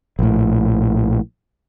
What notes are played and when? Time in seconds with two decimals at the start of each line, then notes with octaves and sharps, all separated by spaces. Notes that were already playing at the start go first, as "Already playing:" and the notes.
0.19 A#1 A2